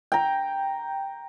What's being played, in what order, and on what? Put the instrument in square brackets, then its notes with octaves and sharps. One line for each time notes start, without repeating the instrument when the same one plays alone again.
[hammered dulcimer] G5 A#5